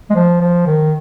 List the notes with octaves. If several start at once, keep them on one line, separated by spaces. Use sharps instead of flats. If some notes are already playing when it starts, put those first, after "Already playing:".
G#3
F3
F3
D#3